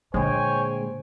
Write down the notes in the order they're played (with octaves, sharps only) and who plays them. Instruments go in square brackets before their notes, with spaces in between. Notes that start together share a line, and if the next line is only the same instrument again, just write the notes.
[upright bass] A#2 D3 [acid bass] G#3 [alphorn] C5 [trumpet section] C#5 G5 G#5